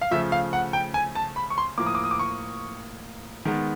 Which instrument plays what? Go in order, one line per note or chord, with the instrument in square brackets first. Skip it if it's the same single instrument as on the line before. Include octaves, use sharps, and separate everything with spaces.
[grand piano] F5
C#3 F3 A3 E5
F5
F#5
G5
G#5
A5
B5
C#6
C6
A2 F3 A#3 D6
D#6
D6
D#6
D6
C#6
D#3 G#3 B3